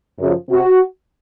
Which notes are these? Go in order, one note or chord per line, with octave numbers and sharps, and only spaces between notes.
F#2 C#3 F3
C3 C4 F#4